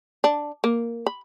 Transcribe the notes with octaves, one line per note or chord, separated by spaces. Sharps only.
D4
A#3
B5